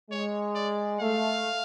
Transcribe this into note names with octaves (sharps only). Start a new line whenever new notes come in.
G#3 C#5
D5
A3 F5